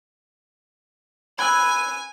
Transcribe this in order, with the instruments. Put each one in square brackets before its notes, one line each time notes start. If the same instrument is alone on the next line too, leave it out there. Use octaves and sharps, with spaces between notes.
[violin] G#5 [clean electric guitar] B5 [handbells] E6 F#6 G#6